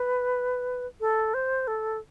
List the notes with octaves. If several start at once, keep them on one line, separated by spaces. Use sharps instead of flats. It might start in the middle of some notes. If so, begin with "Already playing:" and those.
Already playing: B4
A4
C5
A4